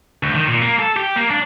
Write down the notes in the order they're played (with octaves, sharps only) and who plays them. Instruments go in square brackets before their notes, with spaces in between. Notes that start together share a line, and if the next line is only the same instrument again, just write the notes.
[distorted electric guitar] D2
D#3
A#2
A#3
A4
G4
A#3
D4